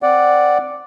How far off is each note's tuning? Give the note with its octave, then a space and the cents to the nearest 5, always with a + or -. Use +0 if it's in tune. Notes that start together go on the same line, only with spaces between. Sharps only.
C4 +0 D5 +0 F#5 +0